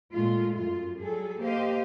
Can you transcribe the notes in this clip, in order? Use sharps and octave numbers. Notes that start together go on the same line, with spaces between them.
A#2 G#3 A3 F4
F#2 F4
F#3 G3 G#4 A4
A#3 G4 C5 D#5 F5